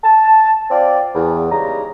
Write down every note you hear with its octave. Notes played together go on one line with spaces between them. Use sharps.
A5
C4 F4 D5
E2
C#3 G3 G#3 D#4 A#5